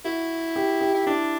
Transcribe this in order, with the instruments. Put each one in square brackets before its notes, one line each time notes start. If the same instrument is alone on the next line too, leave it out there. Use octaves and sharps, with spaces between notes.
[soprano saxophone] E4 [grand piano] F#4
[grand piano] G4
G4
[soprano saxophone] E4
[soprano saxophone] D4 [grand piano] E4